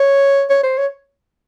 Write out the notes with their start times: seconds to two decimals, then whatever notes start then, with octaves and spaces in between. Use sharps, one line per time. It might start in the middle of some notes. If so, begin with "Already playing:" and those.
Already playing: C#5
0.50 C#5
0.63 C5
0.78 C#5